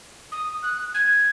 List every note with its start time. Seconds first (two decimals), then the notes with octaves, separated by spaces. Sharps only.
0.32 D#6
0.63 F#6
0.94 G#6